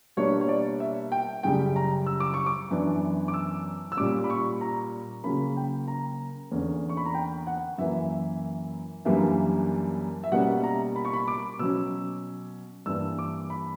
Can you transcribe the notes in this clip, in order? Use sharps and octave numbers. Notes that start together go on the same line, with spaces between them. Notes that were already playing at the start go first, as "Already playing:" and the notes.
B2 G3 A#3 D4 C#5
C#5
D5
E5
G5
F#2 C#3 G3 G5
A#5
E6
D6
C#6
D6
F#2 E3 B3 D4
D6
E6
E6
A#2 G3 C#4 D6
B5
C#6
A#5
C#3 F#3 A#3 C#4 B5
G5
A#5
E2 D3 A#3 C#4
C#6
B5
A#5
G5
F#5
F#2 E3 A#3 E5
F#2 E3 G3 A#3 D4 E5
E5
B2 G3 A#3 C#4 F#5
A#5
B5
C#6
B5
D6
B2 F#3 C#4 E6
G2 E3 A#3 D4 E6
D6
B5